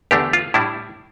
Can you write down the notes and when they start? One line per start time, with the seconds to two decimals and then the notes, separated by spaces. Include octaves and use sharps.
0.11 E2 D3 A3 D4 G4
0.33 F4
0.54 A2 G3 D4 E4